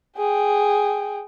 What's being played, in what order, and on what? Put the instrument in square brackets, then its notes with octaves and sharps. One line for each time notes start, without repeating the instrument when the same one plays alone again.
[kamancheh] G#4 G5